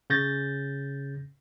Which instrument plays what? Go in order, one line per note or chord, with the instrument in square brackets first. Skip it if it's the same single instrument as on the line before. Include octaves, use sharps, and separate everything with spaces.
[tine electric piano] C#3 G6 A6 A#6